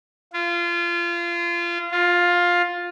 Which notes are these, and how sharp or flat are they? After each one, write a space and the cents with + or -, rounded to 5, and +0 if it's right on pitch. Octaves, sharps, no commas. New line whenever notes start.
F4 -25
F4 +10